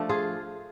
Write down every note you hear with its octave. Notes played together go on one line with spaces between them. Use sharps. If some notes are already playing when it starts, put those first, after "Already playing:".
Already playing: F3 A3 D4
F4 G#4